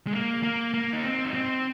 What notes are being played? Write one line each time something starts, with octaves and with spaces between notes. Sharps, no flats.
G#3
A#3
A#3
A#3
D#4
C4
D#4
C4